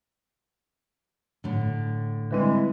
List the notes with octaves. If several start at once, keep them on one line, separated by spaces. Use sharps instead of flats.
A2 D3
D3 E3 G3 G#3 C4